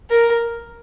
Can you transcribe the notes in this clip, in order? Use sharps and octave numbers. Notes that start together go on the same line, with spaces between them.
A#4